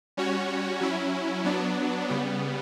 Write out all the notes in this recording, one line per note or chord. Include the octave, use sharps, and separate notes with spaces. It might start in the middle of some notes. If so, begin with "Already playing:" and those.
G3 C#4 F#4 C#5
F#3 C#4 E4
F#3 B3 D4
C#3 G3 B3